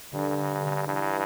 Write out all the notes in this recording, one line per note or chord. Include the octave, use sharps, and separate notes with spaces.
G2 D3
G2 E3